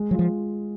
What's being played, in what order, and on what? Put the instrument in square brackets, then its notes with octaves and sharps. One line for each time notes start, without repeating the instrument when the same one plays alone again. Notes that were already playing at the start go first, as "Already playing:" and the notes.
Already playing: [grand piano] G#3
[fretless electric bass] F#3 [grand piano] F4
[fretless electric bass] F3